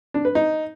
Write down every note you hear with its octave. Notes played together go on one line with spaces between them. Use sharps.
D4
B4
D#4